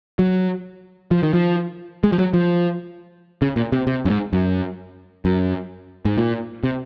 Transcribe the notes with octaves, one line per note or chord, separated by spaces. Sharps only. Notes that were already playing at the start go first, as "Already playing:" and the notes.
F#3
F3
D#3
F3
G#3
F3
F#3
F3
C#3
A#2
C3
C3
F#2
G#2
F#2
F#2
G#2
A#2
C3